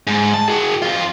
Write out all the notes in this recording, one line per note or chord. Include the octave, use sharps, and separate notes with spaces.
G#2
A5
F#4 G#4
F2 F4